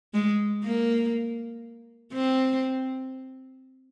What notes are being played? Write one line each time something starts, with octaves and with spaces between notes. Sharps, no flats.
G#3
A#3
C4